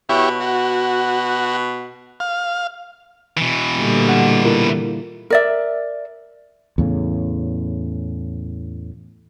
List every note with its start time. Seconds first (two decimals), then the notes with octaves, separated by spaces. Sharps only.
0.09 B2 E4 G4 C#5
0.41 F#4
2.20 F5
3.37 B2 E3
3.78 A#2 D3 G3
4.09 F#5
4.45 E4 F4 A#4
5.30 A#4 D5 E5
6.78 E2 A2 C#3